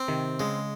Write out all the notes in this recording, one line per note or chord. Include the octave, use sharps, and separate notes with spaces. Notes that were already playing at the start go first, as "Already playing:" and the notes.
Already playing: C4
C3 D#3
C#3 G#3